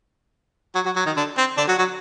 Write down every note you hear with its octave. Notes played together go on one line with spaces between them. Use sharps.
F#3 F#4
F#3 F#4
F#3 F#4
D#3 D#4
D3 D4
C4
D3 D4
F#3 F#4
F#3 F#4